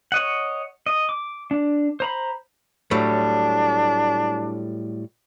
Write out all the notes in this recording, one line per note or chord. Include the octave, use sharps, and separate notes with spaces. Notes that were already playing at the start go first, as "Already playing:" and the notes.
C#5 D#5 F#5
D#5
D6
D4
C5 A#5 B5
A2 F#3 G3 D4